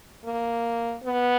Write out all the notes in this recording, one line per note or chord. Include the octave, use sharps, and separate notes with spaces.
A#3
B3